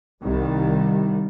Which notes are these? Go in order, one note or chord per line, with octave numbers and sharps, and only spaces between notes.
C2 D#3 G3